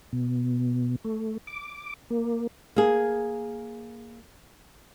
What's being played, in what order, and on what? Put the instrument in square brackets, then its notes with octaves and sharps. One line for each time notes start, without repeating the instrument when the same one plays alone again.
[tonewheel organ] B2
A3
D6
A#3
[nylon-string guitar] A#3 G#4